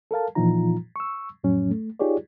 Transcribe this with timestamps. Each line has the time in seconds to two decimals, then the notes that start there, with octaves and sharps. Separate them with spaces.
0.11 A4 A#4 F5 A5
0.35 A#2 E3 F3 D#4 F4 A#5
0.96 C#6 E6
1.44 F2 A2 F#3 C#4
1.71 A3
1.99 D#4 F4 G4 G#4 C#5 D5